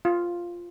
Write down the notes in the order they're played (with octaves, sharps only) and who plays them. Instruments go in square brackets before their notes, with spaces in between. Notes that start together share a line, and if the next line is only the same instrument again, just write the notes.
[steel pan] F4